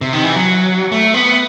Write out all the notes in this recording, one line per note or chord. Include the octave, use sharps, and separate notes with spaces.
C3
D#3
E3
F#3
A3
B3